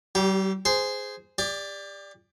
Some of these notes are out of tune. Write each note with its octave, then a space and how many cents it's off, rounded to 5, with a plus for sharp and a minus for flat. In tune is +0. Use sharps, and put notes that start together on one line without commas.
G3 -40 G4 +0
G#4 +0 C5 -15
G4 +35 D5 +0